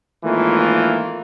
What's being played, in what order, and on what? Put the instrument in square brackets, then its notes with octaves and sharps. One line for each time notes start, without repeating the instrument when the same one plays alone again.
[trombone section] G#1 E3 A3 A#3 F4